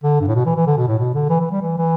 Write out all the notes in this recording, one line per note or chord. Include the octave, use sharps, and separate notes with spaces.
D3
G2
A2
B2
E3
E3
D3
B2
A2
B2
D3
E3
E3
G3
E3
E3